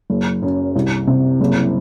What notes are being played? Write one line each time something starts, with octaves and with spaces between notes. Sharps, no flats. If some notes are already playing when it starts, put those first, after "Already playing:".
F#1
F#2
C2
C3
F#1